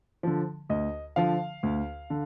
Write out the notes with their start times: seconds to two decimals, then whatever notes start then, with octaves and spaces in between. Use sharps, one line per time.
0.23 D3 F3
0.69 D2 D#5
1.16 D3 F3 F5
1.63 D2
2.10 D3